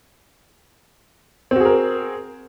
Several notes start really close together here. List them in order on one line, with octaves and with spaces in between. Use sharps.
C4 F#4 G#4 A#4